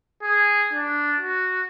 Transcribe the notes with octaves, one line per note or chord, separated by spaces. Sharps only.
G#4
D4
F#4